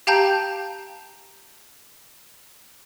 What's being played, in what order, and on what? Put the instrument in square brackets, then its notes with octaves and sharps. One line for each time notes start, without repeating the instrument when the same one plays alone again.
[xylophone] G4 F5 G5 A5 A#5 G6